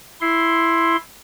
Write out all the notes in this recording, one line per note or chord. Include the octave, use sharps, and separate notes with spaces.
E4 C6